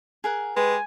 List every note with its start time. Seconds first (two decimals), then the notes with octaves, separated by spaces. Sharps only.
0.24 G#4 A#4 F#5
0.56 G#3 G4 B4 G#5